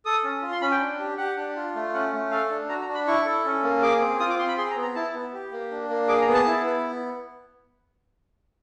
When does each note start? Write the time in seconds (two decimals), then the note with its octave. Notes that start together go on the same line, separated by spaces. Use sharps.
0.05 A4 D#6
0.24 C#4
0.42 F4
0.52 C6
0.61 C#4 B5
0.71 G5
0.80 D4
0.99 G4
1.18 G4 F#5
1.37 D4
1.56 F4
1.75 A3
1.94 C#4 F#5
2.13 A3
2.31 A4 F5
2.50 D4
2.69 F#4 A#5
2.81 A#5
2.88 D4
2.95 B5
3.07 E4 C#6
3.25 A4
3.45 C#4
3.63 A#3
3.82 G#4 D6
4.01 C4
4.20 F4 D#6
4.30 D6
4.39 C4 C6
4.48 B5
4.58 G#4 C6
4.71 A#5
4.76 B3
4.82 A#5
4.95 E4 A5
5.14 B3
5.33 G4
5.52 A#3
5.71 D4
5.89 A#3
6.08 G#4 D6
6.21 A#5
6.27 B3
6.34 A5
6.46 E4
6.65 B3